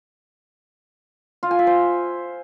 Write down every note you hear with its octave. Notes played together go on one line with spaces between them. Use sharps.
F4
G#5
E5
C5